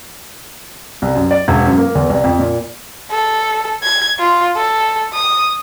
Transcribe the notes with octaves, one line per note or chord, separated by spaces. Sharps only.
C2
F#2
D5
E1
F#2
A#3
E2
C2
F2
A#2
A4
G#6
F4
A4
D#6